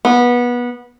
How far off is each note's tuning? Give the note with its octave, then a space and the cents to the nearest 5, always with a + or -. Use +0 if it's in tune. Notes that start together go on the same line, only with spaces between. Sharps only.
B3 -20